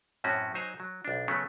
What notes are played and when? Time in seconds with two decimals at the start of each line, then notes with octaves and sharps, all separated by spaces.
0.24 F#2 A2 C4 C#4 F#4
0.54 F#3 D#4 C5 G#5 A#5
0.80 F#3
1.05 B1 D4
1.28 C#3 F#3 A3 B3 C#4